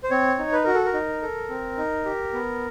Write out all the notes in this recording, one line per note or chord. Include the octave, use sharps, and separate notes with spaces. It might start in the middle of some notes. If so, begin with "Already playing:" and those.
C5
C4 C#5
D#4
B4
F#4 A#4
A4
A#4
D#4
A4
C4
D#4
G4
B3